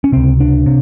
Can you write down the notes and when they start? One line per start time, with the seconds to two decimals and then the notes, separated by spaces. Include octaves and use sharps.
0.04 C#4
0.12 C#2 C3 C4
0.40 D4
0.66 C3